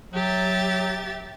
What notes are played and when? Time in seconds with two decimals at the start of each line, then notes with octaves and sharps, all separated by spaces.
0.14 F#3 G4 E5 A6